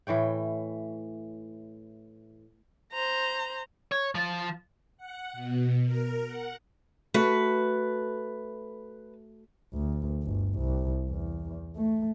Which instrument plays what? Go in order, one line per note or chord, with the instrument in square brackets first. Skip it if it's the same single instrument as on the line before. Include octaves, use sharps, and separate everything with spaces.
[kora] A2 E3 C#5 G5
[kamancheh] C5 A#5
[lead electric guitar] C#5
F3
[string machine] F#5
B2
A#4
F#5
[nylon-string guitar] A3 F#4 [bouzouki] B4
[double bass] D2
G1
C2
E2
A3